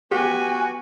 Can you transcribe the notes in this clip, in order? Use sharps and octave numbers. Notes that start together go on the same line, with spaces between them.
B3 F#4 G4 G#5